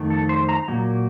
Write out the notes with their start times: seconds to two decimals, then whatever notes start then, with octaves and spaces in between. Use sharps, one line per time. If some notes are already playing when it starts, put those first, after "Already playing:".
Already playing: F2 D#3 A3
0.10 A4
0.29 C5
0.49 A#5
0.68 A#2 F#3 A#3